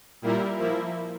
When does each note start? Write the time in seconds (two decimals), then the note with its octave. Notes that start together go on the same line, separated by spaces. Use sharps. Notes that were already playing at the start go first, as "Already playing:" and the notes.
0.22 A#2 G3 A#3 E4 A#4
0.57 F3 A#3 E4